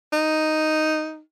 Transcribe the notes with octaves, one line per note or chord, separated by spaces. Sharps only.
D#4